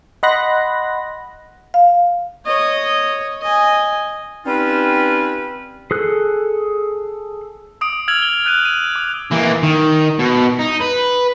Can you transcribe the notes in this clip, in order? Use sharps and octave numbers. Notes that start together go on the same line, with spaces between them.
D#5 F#5 B5 C6 F#6 A#6
F5
C#5 D#5
D#5 G#5
G3 C4 C#4 D#4 F4 B4
G#4 A4 F#6
D6 D#6 D7
E6 F6 G#6 F7 F#7
G7
F6 F#6 G#6 D#7
D#7
D6
E3 A#3
D#3
B2
D#4
B4